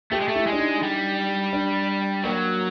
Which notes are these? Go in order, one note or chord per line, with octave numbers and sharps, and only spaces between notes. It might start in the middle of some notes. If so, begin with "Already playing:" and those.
A3 G4
G#3
A3
E4
G#3
D4
D#4
G3
D4
F#3 A#3